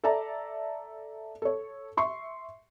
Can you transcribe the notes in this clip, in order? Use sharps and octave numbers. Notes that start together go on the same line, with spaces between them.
A4 D5 E5 A5 A#5
A4 C#5
E5 C6 C#6